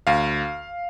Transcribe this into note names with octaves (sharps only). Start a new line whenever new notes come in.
D2 F5